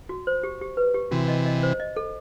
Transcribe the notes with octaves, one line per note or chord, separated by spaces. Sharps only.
F#4
C5
G4
G4
B4
G4
C3 E3 F#4
D#5
D#5
C5
D#5
A4